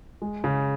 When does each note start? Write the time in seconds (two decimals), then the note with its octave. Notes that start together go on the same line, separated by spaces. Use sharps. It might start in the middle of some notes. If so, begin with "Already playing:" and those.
0.22 G#3
0.44 C#3